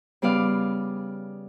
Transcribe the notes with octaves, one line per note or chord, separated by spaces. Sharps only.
C#3 G3 B3 D5 F5